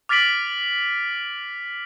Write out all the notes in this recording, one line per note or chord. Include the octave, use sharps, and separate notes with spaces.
D6 F6 A6 B6 D7 F#7